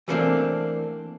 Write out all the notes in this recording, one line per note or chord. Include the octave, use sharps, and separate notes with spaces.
E3 G3 A3 A#3 C4 D4